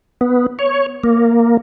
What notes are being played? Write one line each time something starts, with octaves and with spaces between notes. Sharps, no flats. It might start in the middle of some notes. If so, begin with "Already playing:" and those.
B3
C#5
A#3